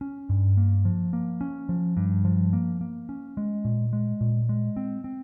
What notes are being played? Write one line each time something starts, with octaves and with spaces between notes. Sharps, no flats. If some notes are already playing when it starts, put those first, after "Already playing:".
C#4
G2
A#3
F3
A#3
C#4
F3
G2
F3
A#3
A#3
C#4
G#3
A#2
G#3
A#2
G#3
C4
C4